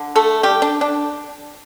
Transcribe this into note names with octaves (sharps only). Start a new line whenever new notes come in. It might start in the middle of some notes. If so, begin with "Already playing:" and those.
Already playing: D3
A3 A4
G3 G4
D4
D4